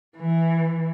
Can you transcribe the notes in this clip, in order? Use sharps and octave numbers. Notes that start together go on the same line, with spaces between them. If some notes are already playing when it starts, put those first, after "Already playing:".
E3